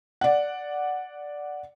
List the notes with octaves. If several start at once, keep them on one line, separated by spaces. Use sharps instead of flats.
D5 F#5